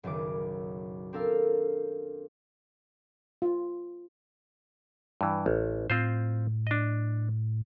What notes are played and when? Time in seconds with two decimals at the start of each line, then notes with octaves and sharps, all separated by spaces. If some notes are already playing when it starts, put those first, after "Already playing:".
0.03 F#1 B1 D#3 D6
1.13 C4 D4 A4 A#4 F5 E6
3.42 F4
5.21 G2 E3
5.46 A1
5.90 A2 C4 F4 C5
6.67 D4 D#5